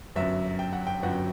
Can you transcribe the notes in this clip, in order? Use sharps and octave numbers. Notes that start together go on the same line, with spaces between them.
G1 F#2 F#3 E5
G5
F#5
G5
G1 F#2 F#3 F#5